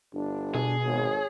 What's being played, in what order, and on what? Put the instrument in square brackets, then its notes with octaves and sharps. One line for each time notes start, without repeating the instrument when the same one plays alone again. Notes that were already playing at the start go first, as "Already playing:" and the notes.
[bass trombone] G1 [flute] D4
[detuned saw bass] B2 [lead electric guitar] G#4
[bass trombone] G#1 [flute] C#5